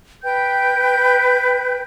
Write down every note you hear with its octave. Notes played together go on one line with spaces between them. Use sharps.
B4 G5 G6